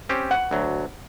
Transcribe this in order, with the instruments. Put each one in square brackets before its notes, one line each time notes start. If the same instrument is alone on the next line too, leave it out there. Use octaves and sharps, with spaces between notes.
[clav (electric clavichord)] C4 C#4 G4
[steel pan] F#5
[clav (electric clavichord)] D2 F#3